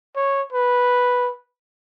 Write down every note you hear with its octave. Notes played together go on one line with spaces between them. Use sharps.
C#5
B4